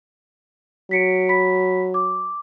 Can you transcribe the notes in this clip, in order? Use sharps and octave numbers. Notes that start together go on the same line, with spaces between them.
F#3 B6 C#7 D7
B5 B6
D6